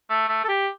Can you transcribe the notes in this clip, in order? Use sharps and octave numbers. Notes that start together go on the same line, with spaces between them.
A3
A3
A4
G4